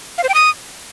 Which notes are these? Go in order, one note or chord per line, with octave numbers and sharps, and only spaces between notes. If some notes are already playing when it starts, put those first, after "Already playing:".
F5
C5
G5
D#6